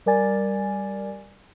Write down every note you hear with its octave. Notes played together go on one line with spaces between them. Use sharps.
G3 A#4 D5 G#5 A6